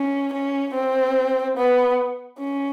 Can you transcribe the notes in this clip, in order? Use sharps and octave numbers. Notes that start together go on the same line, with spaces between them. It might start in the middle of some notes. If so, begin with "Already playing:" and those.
Already playing: C#4
C#4
C4
B3
C#4